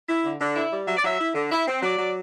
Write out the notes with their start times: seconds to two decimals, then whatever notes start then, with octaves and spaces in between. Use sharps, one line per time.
0.09 E4
0.24 D3
0.40 D3
0.56 E4
0.72 G3
0.88 F#3 E5
0.97 D5
1.04 F#3 E5
1.20 E4
1.35 D3
1.52 E4
1.68 C4
1.82 F#3 D5
1.98 F#3